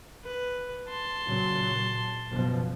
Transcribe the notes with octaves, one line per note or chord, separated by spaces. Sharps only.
B4
A5 C6
A#2 C#3 F#3
F#1 B2 F3